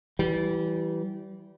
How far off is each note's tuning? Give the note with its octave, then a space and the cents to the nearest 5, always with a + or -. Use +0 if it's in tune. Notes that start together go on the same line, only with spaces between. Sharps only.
E3 +0 G3 -30